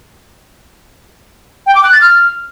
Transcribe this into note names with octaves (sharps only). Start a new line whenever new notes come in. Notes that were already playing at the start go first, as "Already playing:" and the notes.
G5
D6
F#6
A6
F6